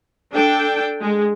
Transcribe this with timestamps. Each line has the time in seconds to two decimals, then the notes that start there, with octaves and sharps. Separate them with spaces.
0.35 D4 A4 G5
1.01 G#3